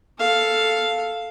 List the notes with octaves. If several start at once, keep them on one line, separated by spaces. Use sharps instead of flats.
A4 F5